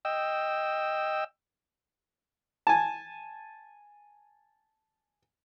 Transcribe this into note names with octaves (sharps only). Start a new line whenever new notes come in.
D#5 G5 E6
G#5 A5